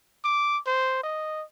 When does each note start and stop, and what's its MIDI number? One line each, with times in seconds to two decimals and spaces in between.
0.24 0.59 86
0.67 1.03 72
1.04 1.43 75